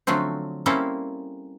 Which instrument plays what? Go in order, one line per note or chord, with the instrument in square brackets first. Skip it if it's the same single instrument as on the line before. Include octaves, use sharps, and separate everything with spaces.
[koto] D3 F3 F#3 A3 C4
G3 A#3 C4 C#4 E4 A4